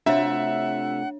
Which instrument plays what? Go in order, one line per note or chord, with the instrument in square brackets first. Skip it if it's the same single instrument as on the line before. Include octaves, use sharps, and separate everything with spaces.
[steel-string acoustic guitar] C3 A3 F4 [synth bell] D4 C#5 [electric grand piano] E5 [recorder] F#5